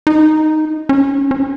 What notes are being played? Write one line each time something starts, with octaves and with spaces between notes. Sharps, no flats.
D#4
C#4
C#4